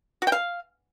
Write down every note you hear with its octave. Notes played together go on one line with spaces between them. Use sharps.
F#4
G5
F5